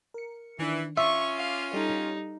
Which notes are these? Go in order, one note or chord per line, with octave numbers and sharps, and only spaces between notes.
A#4 C#7
D#3 E3 D4
C#4 F4 E5 C#6 D6
F5
G3 D#4 G4 A4